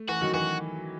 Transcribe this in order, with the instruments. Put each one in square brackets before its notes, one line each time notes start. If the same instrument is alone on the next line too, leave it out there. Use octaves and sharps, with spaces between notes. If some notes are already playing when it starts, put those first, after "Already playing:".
Already playing: [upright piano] A3
[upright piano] E3 [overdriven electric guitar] F#4
[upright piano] D#3 F#3
[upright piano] E3 [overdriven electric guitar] F#4